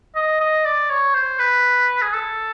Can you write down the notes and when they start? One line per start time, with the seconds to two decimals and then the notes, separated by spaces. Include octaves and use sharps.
0.15 D#5
0.41 D#5
0.65 D5
0.90 C#5
1.14 C5
1.39 B4
2.02 G#4
2.13 A4